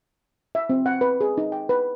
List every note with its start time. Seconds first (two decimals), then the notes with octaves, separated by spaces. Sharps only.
0.55 E5
0.70 C4
0.86 F#5
1.01 B4
1.21 G#4
1.38 D#4
1.52 G5
1.69 B4